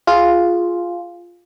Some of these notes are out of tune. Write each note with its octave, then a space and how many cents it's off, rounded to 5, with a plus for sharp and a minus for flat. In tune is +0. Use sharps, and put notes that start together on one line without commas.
F4 +0 G#4 +0